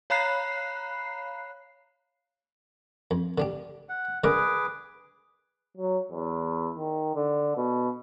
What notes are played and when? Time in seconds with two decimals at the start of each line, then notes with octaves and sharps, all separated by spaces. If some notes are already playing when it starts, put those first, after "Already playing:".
0.10 C#5 F5 A#5 B5 F#6 C7
3.11 F2
3.38 D3 D4 G4
3.89 F#5
4.24 D3 G#3 G#4 A#4 B4 D6
5.77 F#3
6.11 E2
6.78 D#3
7.16 D3
7.57 B2